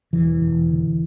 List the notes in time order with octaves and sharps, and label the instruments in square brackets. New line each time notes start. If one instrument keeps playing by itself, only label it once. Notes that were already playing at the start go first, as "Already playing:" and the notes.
[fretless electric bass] E1 E3
E1
D3